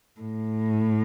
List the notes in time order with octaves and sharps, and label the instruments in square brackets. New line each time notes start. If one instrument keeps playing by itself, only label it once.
[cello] A2